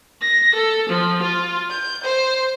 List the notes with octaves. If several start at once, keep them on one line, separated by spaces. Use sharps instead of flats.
A#6
A4
F3
F4
G6
C5